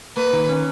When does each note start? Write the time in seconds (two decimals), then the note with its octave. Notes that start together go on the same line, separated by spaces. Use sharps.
0.17 A#3 B4
0.33 D#3
0.49 C#4